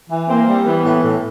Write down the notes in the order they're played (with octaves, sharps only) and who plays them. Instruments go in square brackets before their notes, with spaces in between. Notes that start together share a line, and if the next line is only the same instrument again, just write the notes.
[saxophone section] E3
[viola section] A#3 [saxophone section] C4
[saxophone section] G3
[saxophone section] E3 [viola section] B3
[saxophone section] A2
A2